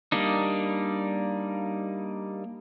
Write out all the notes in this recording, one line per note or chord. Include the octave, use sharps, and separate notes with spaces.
G3 A#3 D4 D#4